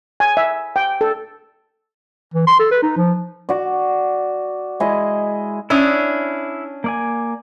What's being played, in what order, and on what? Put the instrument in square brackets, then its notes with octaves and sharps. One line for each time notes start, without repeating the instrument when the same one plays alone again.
[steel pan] G#5
E5
G5
A4
[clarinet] E3
C6
A4
B4
D#4
F3
[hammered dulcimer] F#4 D5
G#3 E4 G#4 D#5
[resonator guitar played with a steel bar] C#4 D4 [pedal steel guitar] E4 E5 D#6
[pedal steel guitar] A#3 D5 G#5